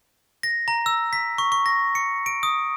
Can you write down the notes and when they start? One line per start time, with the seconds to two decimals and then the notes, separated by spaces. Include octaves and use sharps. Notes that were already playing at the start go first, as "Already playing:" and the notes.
0.43 A#6
0.68 A#5
0.86 E6
1.13 B6
1.38 C#6
1.52 C#6
1.66 A#6
1.95 C#7
2.26 D7
2.43 D#6